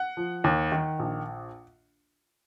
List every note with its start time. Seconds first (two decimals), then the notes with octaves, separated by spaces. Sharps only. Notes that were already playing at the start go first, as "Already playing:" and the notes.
Already playing: F#5
0.17 F3
0.44 D#2
0.72 D#3
0.99 A#1